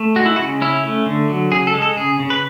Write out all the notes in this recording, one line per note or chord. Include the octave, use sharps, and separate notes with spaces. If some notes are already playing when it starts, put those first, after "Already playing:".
Already playing: A3
G#3 F#4
E4
F#4
C#3
C#4 E4
A3
D3
F#3
C#3 G#4
A4
G#3
A4
C#3 G#4
C#3
B4